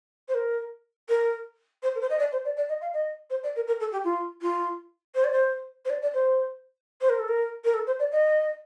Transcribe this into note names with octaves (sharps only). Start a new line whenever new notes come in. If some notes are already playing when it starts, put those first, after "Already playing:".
C5
A#4
A#4
C5
A#4
C5
D#5
D5
C5
D5
D5
D#5
F5
D#5
C5
D5
A#4
A#4
A4
G4
F4
F4
C5
D5
C5
C5
D5
D5
C5
C5
A#4
A4
A#4
A#4
A4
C5
D5
D#5